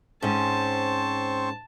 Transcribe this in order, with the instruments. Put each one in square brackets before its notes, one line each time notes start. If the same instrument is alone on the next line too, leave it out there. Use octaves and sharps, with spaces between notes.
[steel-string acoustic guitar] G#2 C#4 [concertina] C4 C5 C#6 [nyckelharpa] A5